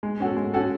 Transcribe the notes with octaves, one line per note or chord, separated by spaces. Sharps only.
G#3
C#4 F#4 A4
G#3
C#4 F#4 A4